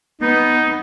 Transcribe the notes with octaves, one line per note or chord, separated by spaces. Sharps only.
B3 D#4